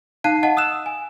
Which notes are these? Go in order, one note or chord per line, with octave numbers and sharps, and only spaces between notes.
D#4 F5 A5 F#6 C7 D#7
D#5 F#5 A5
D#6 E6 F#6 E7
G#5